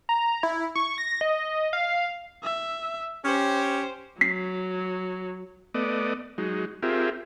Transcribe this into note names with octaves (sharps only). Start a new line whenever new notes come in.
A#5
E4
C#6
A#6
D#5
F5
E5
C#4 G4 C5
F#3 B6 C7
A3 B3 D5 D#5
F#3 G#3 D#4
C4 F4 G4 G#4 A#4 E5